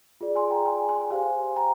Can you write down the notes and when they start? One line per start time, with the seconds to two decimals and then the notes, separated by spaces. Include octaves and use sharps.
0.21 F4 G#4 D5
0.36 G#5 C6
0.50 G5 A#5
0.65 G#5 C6
0.89 G#5 C6
1.11 G4 C5 F5 G#5
1.56 G5 A#5